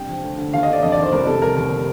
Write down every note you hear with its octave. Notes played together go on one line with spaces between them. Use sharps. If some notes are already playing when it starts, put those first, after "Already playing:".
Already playing: G2 C3 G5
F3
D2
D3
D#2 F5
D#5
D3 D5
F2 D#5
D5
D#3 C5
C2 A#4
C3 A4
F1 A#4
D#2